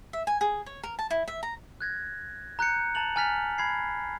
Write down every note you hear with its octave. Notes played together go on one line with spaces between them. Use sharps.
E5
G#5
G#4
C#5
A#4
A5
E4
E5
A#5
F#6 G#6 A#6
A#5 F#6 G6 C#7
A5 A#5 A6 F7 F#7
G#5 A#5 F6 A6 B6 F7
B5 G#6 C7